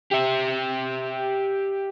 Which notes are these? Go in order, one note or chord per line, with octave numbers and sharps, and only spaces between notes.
G4 E5